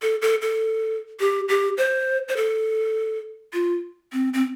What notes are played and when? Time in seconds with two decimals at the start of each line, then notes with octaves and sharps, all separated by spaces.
0.02 A4
0.22 A4
0.42 A4
1.20 G4
1.49 G4
1.78 C5
2.28 C5
2.37 A4
3.53 F4
4.12 C4
4.33 C4